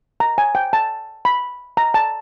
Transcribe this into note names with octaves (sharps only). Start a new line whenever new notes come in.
A#5
G#5
G5
A5
B5
A#5
A5